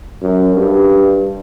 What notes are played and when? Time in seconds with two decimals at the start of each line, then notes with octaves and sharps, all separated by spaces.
0.22 F#2
0.56 G2